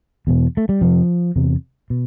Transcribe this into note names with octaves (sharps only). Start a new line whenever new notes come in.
E2 B2
A3
G3
F2 C3 F3
E2 C3
B2